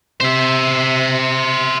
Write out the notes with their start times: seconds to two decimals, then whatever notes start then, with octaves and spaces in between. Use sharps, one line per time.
0.21 C3 C5 E5